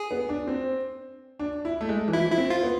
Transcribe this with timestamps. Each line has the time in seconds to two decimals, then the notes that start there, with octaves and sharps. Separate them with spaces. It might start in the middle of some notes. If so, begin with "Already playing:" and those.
Already playing: G#4
0.11 B3
0.29 D4
0.47 C4
1.39 D4
1.65 E4
1.81 A3
1.89 G#3
2.08 E3
2.13 F3 E4
2.32 E4
2.38 C4
2.50 F4
2.63 B3